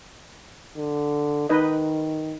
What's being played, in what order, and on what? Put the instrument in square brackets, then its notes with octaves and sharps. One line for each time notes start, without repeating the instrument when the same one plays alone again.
[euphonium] D3
[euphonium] D#3 [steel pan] D#4 B4 D#5